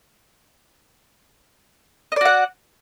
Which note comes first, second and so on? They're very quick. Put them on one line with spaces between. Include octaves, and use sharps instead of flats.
D#5 D5 F#4 F#5